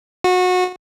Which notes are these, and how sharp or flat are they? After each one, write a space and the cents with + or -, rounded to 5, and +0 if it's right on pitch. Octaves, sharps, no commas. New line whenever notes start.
F#4 -25